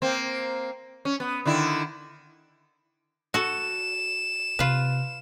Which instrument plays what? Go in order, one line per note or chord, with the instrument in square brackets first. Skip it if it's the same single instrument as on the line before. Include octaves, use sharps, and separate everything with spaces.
[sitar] A#3 C4
C#4
B3
D3 D#3 E4
[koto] F#4 A4 [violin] E7
[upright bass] C3 [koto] F4 B4